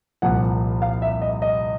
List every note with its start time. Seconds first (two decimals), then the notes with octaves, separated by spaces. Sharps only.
0.22 C2 A#2 F3 F#5
0.82 F5
1.02 E5
1.22 D#5
1.42 D#5